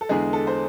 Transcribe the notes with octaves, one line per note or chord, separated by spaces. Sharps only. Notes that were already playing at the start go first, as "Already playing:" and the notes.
A4
E2 D3 G#3 G#4
A4
C5